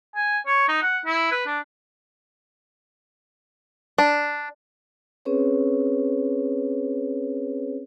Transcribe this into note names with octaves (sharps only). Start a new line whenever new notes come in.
G#5
C#5
D#4
F#5
E4
B4
D4
D4
C4 C#4 G#4 B4 C#5